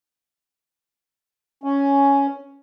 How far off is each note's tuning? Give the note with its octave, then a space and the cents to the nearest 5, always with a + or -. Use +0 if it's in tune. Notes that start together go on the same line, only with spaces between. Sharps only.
C#4 +5